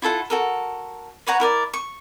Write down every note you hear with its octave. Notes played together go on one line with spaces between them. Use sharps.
E4 F4 A4 F#5
F#4 A4 A#4
B4 C#5 F#5 A#5
E4 A#4 D5
C#6